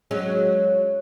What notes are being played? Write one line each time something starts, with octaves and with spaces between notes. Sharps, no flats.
F#3 G#3 C#4